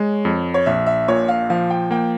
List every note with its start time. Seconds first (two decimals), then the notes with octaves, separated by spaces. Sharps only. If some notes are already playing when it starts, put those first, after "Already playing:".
Already playing: G#3 C#5
0.25 F2
0.54 C#5
0.66 A#1 E5
0.86 E5
1.08 A#2 C#5
1.28 F5
1.50 F3 F5
1.70 G5
1.91 A#3 G5